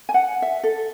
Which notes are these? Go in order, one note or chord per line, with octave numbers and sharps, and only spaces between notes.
G#5
F#5
E5
A4